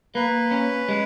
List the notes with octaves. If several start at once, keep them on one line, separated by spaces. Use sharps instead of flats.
A#3 B4
C#4
G#3